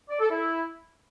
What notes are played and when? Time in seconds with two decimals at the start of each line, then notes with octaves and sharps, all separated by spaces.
0.09 D5
0.20 A4
0.30 E4